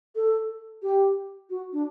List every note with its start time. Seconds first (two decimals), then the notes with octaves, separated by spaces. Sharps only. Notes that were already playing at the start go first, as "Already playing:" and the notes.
0.15 A4
0.83 G4
1.50 F#4
1.73 D4